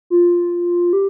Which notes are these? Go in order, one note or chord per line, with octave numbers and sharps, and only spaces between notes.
F4
G4